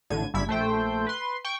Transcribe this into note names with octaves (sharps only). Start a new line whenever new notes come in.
A1 A2 D3 G#6 D#7
G1 G3 E4 G#6 B6
A#1 A3 C5 G5
B4 C6
G5 C#6